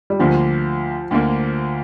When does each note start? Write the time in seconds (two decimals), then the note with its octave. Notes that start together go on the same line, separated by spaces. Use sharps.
0.10 G3
0.19 D2 D3 F3 A#3
1.11 D2 D3 A#3